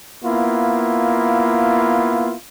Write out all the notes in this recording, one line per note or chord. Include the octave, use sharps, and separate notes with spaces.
A#3 B3 E4 F4